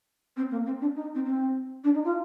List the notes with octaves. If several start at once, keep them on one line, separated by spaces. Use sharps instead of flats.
C4
A#3
C4
D4
D#4
C4
C4
D4
D#4
F4